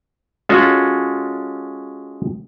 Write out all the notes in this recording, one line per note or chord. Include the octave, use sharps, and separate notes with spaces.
G#3 C#4 F4 F#4 A4 G#5